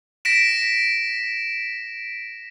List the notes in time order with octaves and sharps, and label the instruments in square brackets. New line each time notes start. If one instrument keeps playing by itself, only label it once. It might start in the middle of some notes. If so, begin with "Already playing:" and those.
[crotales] A#6 B6 D7 E7